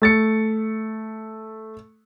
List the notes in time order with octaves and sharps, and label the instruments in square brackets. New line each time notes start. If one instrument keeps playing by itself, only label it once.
[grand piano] A3 A6 C#7